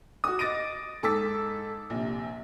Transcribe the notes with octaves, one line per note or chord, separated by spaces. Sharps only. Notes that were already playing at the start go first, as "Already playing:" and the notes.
F#4 D#6
D#5 D6 A6 A#6 D7 D#7
G#2 A4 D6 E6 A6 B6
A#1 C3